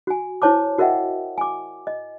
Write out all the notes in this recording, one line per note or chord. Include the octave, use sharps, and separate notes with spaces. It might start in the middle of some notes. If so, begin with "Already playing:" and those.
F#4 G#5
E4 C5 C#5 A5 D6
F#4 A#4 D#5 E5 F#5 G5
G#5 D6
D#5